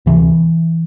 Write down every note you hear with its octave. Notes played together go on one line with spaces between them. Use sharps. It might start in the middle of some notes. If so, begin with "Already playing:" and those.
D2 C3 E3